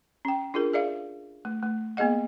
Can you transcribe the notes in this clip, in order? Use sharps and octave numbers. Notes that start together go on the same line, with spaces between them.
C#4 G5
D4 F4 G#4 A#4
G#4 D5 E5 F5
A3
A3
A#3 B3 G#4 D#5 F#5